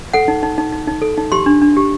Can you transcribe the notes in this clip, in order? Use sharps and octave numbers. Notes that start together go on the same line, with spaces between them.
A4 F#5
D#4
D#4
D#4
D#4
D#4
A4
D#4
G4 C6
D4
D4
G4